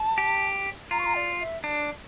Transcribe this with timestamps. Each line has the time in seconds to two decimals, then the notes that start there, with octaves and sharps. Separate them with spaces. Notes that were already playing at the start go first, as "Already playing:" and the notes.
Already playing: A5
0.18 G4
0.91 F4 A#5
0.98 C#6
1.06 A#5
1.15 D5
1.40 E5
1.64 D4